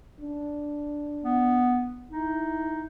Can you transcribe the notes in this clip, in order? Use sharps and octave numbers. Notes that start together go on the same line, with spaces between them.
D4
B3
D#4 E4